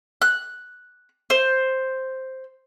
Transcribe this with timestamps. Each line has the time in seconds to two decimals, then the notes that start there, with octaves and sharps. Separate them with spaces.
0.22 F#6
1.30 C5